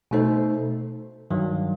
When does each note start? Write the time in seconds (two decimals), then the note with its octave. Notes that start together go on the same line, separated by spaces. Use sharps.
0.11 B2 A3 D#4 A4 C5
1.31 G2 D#3 F#3